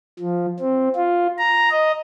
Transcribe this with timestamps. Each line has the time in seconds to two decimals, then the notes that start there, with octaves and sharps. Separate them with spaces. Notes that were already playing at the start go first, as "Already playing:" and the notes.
0.19 F3
0.60 C4
0.96 F4
1.38 A#5
1.72 D#5